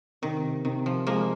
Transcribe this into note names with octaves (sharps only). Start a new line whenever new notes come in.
C3 D#3
C3 D#3
F3
F3 G#3 A#3